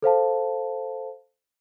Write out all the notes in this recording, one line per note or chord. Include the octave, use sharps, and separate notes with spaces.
A4 C5 F5 A5